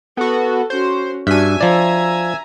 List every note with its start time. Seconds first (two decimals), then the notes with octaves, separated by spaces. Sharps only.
0.17 B3 F#4 A4
0.70 C#4 F#4 C5
1.27 G2 D4 F#4 E5 G#5
1.61 F3 D5 A#5